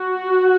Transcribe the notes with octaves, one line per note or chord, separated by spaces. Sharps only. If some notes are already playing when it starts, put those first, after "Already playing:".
Already playing: F#4